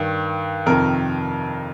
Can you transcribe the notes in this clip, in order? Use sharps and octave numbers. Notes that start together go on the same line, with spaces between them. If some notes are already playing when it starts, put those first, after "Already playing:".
Already playing: G2 D#3
F2 C3 D#3 A#4